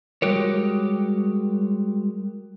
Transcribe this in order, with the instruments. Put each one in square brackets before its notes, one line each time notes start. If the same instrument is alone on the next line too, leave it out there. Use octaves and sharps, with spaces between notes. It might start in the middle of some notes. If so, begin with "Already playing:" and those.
[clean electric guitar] G3 G#3 F#4 G4 A#4 C#5